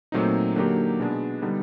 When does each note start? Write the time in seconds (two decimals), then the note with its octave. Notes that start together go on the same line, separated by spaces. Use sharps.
0.12 A#2 F#3 A3 C4 D#4
0.56 D3 F#3 A#3 D#4 G4
1.00 B2 G#3 B3 D4
1.42 D3 G3 B3 D#4